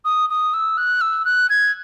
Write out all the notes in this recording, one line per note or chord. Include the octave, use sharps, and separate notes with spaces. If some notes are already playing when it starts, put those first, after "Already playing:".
D#6
D#6
E6
F#6
E6
F#6
G#6